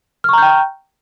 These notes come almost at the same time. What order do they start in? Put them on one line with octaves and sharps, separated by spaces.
F6 C#6 A#5 G6 G5